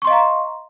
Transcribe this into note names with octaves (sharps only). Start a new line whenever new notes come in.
D#5 F5 A#5 C6 C#6